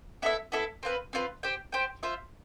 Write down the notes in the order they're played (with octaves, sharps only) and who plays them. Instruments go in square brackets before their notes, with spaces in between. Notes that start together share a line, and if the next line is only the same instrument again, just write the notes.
[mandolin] B3 E4 A4 E5
B3 E4 A4 E5
C4 F4 B4
C4 F4 B4
G4 C5 G5
G4 C5 G5
F4 C5 E5